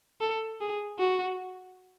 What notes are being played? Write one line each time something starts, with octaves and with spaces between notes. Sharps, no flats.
A4
G#4
F#4